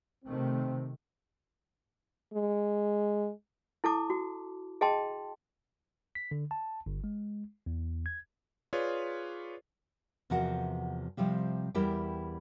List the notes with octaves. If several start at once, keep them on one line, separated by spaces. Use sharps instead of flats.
C3 D#3 A3 C4
G#3
E4 A4 A5 D6
F#4
G#4 D#5 G5 A5 C6
B6
D3
A5
G1
G#3
E2
G#6
F4 G#4 B4 C#5 D5
E2 C3 F3 F#4 A#4 F#5
C3 F3 G3 C4
E2 G3 E4 G4 A#4 G5